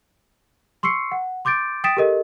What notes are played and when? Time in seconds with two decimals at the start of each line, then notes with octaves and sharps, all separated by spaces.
0.83 C6 C#6 E6 C7 C#7
1.12 F#5
1.45 C6 D6 G6 A6 D7
1.84 G5 D#6 A6 B6 D7 E7
1.97 G4 A4 A#4 D#5